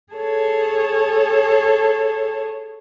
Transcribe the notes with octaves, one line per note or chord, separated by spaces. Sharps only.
G#4 A4 C#5 A5